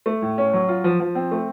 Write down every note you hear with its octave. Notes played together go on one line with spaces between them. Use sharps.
A3
A2
C#4
F#3
F4
F3
F3
C4
A3